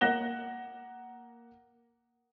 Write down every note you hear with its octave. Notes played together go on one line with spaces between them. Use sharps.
A#3 F#5 F#6 A#6 E7 G7